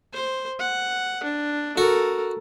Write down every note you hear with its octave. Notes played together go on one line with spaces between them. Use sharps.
C5
F#5
D4
F#4 A4 A#4